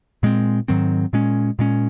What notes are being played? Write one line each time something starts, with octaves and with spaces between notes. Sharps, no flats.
A#2 G#3 C4
G#2 D#3 F#3 C4
A#2 G#3 C#4
A#2 G#3 C#4